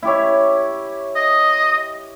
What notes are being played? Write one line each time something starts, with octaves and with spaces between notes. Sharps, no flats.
E4 G4 C#5
D#5